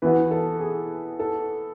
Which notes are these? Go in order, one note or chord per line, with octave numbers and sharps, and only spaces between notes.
E3 B3 F#4 B4
A4
G#4
A4